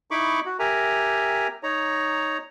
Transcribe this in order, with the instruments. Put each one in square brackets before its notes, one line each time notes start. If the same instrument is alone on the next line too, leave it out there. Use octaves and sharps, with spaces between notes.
[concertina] D#4 E4 B5 C#6 D6
F#4
G4 A#4 E5 G#5 A#5
D#4 C#5 A#5